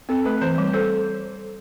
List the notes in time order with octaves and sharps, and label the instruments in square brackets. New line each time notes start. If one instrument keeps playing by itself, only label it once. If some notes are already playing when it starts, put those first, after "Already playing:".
[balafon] C4 [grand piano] A4
[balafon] A3 [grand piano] B4
[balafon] E3 [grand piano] C5
[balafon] G3
[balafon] A4 [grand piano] C5